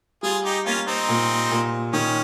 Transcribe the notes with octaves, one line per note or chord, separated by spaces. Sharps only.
G3 F4 G#4
D#4 G4
A#3 C#4 F4
C4 D#4
A#2
A#2
D#3 C#4